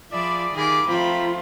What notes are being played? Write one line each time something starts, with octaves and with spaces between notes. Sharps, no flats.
F3 G#4 D5 E5 B5
D#3 F4 G4 G#4 B5 D6
F3 A3 C4 F4 G5 A#5 B5